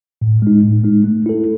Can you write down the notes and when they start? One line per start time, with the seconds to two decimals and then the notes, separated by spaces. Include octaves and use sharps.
0.22 A2
0.42 G#3 D#4
0.63 A2
0.84 G#3 D#4
1.04 A3
1.26 E4 A4